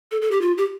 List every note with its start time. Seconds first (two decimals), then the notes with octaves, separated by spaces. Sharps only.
0.12 A4
0.22 A4
0.31 G4
0.42 F4
0.58 G4